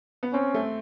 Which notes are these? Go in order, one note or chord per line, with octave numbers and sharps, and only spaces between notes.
B3
C4 C#4
A3